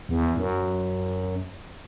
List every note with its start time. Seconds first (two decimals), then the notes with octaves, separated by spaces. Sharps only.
0.09 E2
0.37 F#2